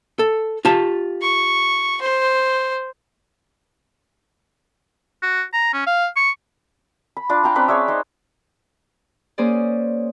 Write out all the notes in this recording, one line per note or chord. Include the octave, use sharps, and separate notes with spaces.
A4
F4 G4 A5
C#6
C5
F#4
A#5
C#4
F5
C#6
B5
D4 F4 D5
F5 G5 A5 A#5
C4 C#4 B4 D5
G#4 C#5 D5 E5
D#4 C5
A#3 C#4 G#4 C5 D5